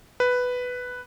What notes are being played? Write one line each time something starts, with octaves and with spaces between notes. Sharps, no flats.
B4